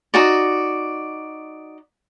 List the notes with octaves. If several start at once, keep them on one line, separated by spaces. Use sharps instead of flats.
D#4 F#4 D5